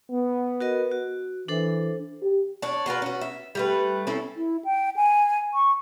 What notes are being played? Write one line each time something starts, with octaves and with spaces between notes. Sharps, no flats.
B3
F#4 A#4 D#5
F#4
E3 D4 A4 C5
G4
D4 C#5
F4 F#4 A#4 B4
C#4 F#4
E5
G3 A3 B4
C4 C#4 E4 A4
E4
G5
G#5
C#6